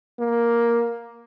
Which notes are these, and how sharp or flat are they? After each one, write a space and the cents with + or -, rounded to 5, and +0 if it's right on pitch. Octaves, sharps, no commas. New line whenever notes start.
A#3 +5